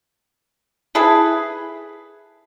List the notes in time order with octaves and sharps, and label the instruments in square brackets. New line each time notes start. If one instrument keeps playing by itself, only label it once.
[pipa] E4 G#4 A4 B4